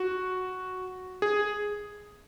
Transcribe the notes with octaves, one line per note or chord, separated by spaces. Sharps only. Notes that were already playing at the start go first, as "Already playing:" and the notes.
Already playing: F#4
G#4